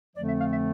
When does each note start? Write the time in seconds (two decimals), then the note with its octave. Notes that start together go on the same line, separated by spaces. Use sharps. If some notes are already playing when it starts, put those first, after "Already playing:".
0.16 F2 D3 F3 A3 C4 D5
0.28 E5
0.40 F5
0.52 E5